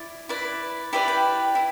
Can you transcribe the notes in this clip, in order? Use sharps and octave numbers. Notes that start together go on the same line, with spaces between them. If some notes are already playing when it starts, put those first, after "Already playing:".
Already playing: E4 D5
E4 B4 D5
E4 G4 B4 D5 B5
G5
E4